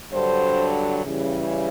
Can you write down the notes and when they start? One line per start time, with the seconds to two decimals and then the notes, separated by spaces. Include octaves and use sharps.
0.12 G2 D3 F#3 C5
1.04 C#3 E3 G3